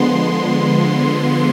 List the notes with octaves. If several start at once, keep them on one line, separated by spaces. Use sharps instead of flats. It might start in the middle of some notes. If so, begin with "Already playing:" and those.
Already playing: D3 F3 G#3 B3 C6